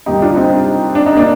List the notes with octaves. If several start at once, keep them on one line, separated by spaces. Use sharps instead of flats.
D#2 D#3 G3 D#4 G4
D4 F4
C4 D#4
D4
D#4
A#3 D4